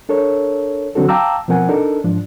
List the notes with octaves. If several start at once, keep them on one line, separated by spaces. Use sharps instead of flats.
D4 A4 A#4 C#5
D3 F#3 C4 D4 F#4 A4
F5 G5 A5 A#5 D6 E6
B2 F3 C4 A#4 F#5 G#5
D4 D#4 A4 A#4
G#2 F3 D4